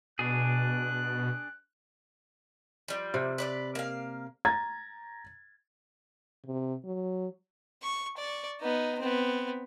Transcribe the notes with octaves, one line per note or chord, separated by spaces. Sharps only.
B2 D4 G#4 F#6
F3 G3
C3
B4 C#5 D5
A#3 F5
A#5 G#6 A6
C3
F#3
C#6
D5 C#6
B3 D#4
B3 C4